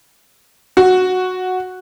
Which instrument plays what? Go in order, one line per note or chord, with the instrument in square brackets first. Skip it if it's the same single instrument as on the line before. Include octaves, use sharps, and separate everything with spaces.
[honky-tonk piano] F#4